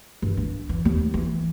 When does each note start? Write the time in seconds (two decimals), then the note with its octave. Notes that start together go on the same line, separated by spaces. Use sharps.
0.22 G2
0.37 D4
0.69 E3
0.85 D#2
1.14 E3